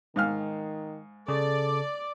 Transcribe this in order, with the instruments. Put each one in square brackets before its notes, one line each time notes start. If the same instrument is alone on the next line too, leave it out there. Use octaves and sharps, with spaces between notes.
[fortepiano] G#2 F5 F6 [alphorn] D#3
[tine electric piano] C#3 [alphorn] A4 [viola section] D5